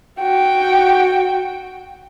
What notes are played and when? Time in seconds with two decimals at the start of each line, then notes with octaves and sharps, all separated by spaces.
0.20 F#4 G5